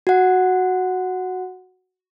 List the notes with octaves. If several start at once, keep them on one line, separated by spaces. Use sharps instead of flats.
F#4 F#5